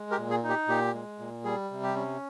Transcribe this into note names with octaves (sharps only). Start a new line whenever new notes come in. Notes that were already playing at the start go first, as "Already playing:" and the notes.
Already playing: G#3
G4 A#4
A#2
G#4
D#4
G4
A#2 G4
G#3
A#2
G3 G#4
C3
G4
C#4